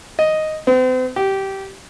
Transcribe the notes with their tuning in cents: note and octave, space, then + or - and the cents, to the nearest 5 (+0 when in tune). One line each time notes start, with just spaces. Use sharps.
D#5 +0
C4 -40
G4 -15